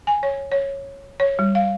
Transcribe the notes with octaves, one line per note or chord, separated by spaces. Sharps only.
G#5
C#5
C#5
C#5
G3
F5